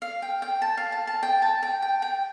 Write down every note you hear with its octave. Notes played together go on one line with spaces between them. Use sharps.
F5
G5
G5
A5
F5
A5
A5
G5
A5
G5
G5
G5